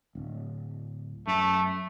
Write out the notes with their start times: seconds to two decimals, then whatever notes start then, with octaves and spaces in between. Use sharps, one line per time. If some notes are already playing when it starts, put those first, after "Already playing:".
0.15 D1
1.27 F#2 A3